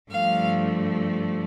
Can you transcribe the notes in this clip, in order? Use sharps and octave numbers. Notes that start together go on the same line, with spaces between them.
G2 F3 A3 F5